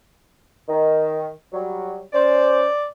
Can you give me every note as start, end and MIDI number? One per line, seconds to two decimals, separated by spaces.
0.68 1.27 51
1.53 1.99 54
1.53 1.99 55
2.13 2.64 61
2.13 2.64 72
2.13 2.85 74